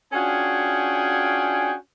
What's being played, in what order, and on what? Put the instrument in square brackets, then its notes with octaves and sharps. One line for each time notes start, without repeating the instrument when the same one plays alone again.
[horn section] C#4 D4 F4 F#4 G#4 G5